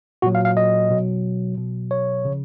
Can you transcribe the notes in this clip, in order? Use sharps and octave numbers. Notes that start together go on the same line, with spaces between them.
A#2 F#3 F#4
F5
F5
D#5
B2 F#3
B2 F#3
C#5
C#3 F3